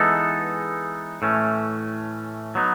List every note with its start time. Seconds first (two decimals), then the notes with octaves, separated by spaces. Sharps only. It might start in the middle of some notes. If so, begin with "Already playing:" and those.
Already playing: E3 G#3 B3 D#4 A4
1.22 A2 E3 A3 C#4
2.55 F#3 B3 D#4